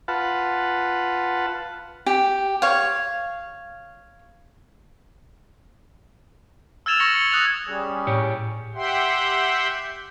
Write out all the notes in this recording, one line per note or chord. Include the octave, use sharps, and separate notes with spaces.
F4 B4 F#5 A5
G4
C#5 F5
E6 F6 G#6 A6 E7 F7
C#6 A#6 C#7 F#7 G7
C#7
D#6 F#6 G#6 A6 F7
G3 C#4 G#4
A2 G4 C#5
G4 E5 F#5 G5 C6